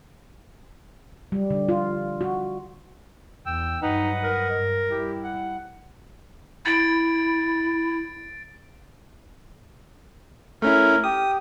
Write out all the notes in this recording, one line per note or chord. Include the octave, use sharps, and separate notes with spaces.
G3
D3
F4
F#4
E2 G5 E6
G2 F#3 D#4 B4 D#5 F#5
A#4
G2
G3 E4 G4
F#5
E4 A6 D7
A3 C#4 E4 A#4
G4 D#6